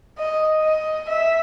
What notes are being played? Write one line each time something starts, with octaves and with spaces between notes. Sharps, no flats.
D#5
D#5
E5